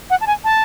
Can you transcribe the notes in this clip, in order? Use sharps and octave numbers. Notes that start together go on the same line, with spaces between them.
F#5
A5
G#5
A5